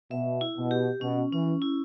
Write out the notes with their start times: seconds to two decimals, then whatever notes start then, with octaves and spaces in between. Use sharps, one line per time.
0.11 B2 E5
0.41 E4
0.57 B2
0.71 G4
1.01 B2 C#4
1.32 E3 C#4
1.62 E4